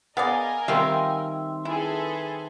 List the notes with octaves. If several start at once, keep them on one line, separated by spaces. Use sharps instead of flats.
B3 G#4 A#4 D5 D#5 F5 G#5
D#3 G3 C4 F4 E5 F5
E4 G#4 A4 B4